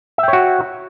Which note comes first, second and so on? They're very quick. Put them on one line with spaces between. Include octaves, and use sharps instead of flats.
E5 G5 C#5 F#4